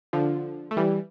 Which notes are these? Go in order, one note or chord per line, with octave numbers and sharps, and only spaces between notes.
D3 F3
A3
E3 G3